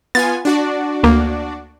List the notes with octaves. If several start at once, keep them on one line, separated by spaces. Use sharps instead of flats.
B3 F4 G#5 A6
D4 F#4 D5
D2 A#3